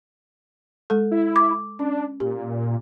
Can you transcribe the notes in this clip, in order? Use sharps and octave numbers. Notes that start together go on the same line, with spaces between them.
G#3 A4
E4
D6
C#4 D4
A#2 G4